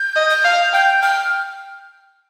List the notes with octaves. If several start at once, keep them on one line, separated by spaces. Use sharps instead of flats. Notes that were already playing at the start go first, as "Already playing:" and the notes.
Already playing: G6
D#5
G6
F5
G5 G6
G5 F6